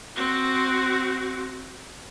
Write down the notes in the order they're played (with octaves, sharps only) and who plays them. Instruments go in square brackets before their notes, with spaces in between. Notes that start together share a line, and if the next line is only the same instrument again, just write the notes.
[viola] C4 F#4